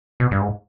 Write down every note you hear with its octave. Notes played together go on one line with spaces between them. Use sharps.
B2
G2
G#2